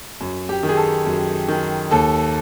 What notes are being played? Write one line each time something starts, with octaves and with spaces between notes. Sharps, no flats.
F#2
G4
D#3
G#4
A4
F#2
D#3
D#2 A4